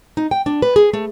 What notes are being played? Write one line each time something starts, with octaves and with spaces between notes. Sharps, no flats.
D#4
G5
D4
B4
G#4
A3